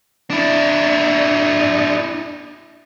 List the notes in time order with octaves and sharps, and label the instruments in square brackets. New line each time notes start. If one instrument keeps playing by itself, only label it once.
[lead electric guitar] D4 E4